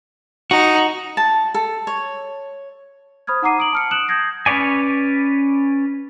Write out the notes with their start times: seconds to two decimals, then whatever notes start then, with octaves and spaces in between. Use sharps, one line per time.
0.51 D#4 F#4
1.17 A5
1.54 A4
1.87 C#5
3.27 C5 B5 D#6 F6 G#6
3.42 D#4 F#5 A#5 D6 C7 D#7
3.58 D#6 D7 F#7
3.73 A5 F6 C#7
3.91 D#6 F#6 C#7 D7 E7 F#7
4.08 D#6 G6 G#6 A#6 C7
4.46 C#4 B4 C#5 D5 G#5